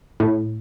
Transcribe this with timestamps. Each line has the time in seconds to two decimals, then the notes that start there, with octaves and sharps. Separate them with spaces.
0.20 A2